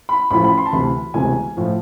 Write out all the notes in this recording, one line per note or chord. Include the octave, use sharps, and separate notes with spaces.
B5
A1 A2 F3 B5
B5
C6
A5
D2 C3 E3 B5
E1 D2 C3 G#5
A2 F3